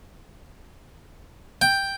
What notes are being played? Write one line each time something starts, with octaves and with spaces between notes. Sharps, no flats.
G5